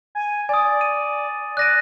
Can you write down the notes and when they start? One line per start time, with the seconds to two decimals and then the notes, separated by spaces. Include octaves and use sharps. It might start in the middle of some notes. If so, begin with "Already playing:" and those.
0.15 G#5
0.49 D5 G#5 D#6
0.81 D#7
1.57 D5 F#6 A#6 D#7